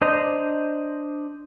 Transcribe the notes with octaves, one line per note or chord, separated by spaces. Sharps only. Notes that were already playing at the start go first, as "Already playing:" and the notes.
D4 C5 D#5 A#5